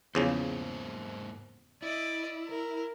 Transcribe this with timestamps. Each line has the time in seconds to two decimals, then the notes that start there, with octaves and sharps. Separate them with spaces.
0.15 E2 G#2 C#3 F3 A#3 C5
1.82 E4 D5 D#5
2.48 A#4